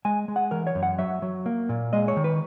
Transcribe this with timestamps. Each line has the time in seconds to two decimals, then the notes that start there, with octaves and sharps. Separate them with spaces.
0.05 G#3 G#5
0.28 G#3
0.36 F#5
0.51 E3 A#4
0.67 C#5
0.75 F#2
0.83 F#5
0.98 F#3 E5
1.22 F#3
1.46 A#3
1.69 A#2
1.93 G#3 D#5
2.08 C#5
2.17 D#3
2.24 B4